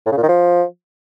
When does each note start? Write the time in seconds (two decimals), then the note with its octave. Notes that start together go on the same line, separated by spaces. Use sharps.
0.06 A2
0.12 C#3
0.17 A#2
0.23 D#3
0.29 F3